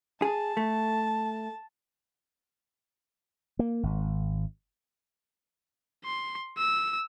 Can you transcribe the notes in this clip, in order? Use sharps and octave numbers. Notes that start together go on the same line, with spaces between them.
G#4 A5
A3
A#3
G#1
C6
E6